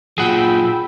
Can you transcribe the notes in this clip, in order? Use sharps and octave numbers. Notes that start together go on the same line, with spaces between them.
A#2 F#3 F4 G#4 F#5 G5 B5 E6